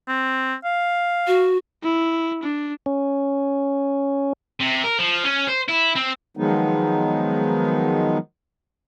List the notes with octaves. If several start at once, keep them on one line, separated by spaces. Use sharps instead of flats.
C4
F5
F#4
E4
D4
C#4
C3
A#4
F3
C#4
C5
E4
C4
D#3 F3 F#3 G#3 B3 D#4